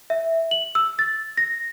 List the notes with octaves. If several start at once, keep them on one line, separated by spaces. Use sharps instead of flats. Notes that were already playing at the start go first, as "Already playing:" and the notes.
E5
F#7
E6
A6
A#6